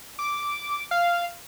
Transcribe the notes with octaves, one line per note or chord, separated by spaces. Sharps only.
D6
F5